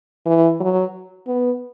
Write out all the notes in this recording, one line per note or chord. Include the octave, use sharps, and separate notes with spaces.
E3
F#3
B3